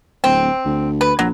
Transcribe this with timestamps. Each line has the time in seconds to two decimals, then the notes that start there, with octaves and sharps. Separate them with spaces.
0.24 D1 C4
0.65 D2
1.01 B4
1.19 A#1 F#3